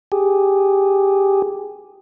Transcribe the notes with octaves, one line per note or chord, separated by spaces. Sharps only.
G4 G#4